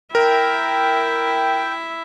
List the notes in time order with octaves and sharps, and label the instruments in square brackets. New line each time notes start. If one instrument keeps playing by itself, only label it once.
[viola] E4 E5 [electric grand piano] A#4 [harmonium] G5